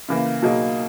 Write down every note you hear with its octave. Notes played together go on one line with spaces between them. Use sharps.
C#3 E3 A#3
B2 F#3 A#3 D#4 G#4